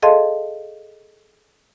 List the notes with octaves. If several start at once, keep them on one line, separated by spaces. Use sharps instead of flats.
G#4 A4 D#5 F5 A5 C6